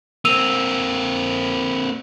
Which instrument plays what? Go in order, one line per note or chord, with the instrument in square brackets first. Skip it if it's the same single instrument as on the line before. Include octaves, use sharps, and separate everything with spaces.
[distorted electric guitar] A#3 C4 [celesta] E6 D#7 F7